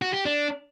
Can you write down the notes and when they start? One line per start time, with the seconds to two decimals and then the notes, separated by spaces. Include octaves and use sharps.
0.02 F#4
0.14 G4
0.25 D4